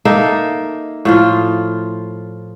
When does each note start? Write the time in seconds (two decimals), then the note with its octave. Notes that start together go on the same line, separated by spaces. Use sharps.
0.05 A#3 D#4 A4 E5
1.05 A2 F3 F4